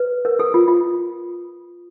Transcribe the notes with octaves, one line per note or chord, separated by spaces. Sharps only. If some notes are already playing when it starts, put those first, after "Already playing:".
Already playing: B4
A#4
A4
F4
F4